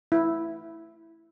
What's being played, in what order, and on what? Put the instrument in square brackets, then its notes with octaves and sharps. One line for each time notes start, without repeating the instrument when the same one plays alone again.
[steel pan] E4